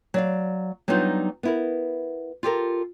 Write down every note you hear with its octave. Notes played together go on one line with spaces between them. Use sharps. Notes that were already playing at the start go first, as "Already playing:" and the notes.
F#3 D5 F5
F#3 G3 B3 D4 D#4 F4
B3 E4 A#4
F4 G4 A4 A#4